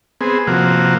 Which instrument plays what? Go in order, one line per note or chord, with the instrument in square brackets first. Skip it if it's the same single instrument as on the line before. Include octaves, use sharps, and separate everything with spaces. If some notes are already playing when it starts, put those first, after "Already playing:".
[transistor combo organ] B3 C4 G#4
C3 F3 A#3 F#4